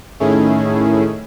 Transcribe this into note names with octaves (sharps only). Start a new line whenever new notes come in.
A2 D#3 A3 C#4 E4 G#4